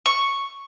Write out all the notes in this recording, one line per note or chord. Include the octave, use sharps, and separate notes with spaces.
C#6